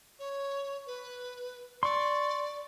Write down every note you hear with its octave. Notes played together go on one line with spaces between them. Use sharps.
C#5
B4
D5 C6 C#6